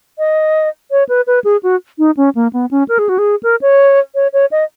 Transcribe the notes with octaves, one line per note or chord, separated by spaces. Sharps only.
D#5
C#5
B4
B4
G#4
F#4
D#4
C#4
A#3
B3
C#4
A#4
G#4
F#4
G#4
A#4
C#5
C#5
C#5
D#5